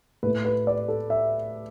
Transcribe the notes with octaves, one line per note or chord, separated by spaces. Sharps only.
A2 A3 B4
B4
D5
A4
E5